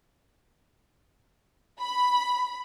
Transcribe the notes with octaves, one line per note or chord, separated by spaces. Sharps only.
B5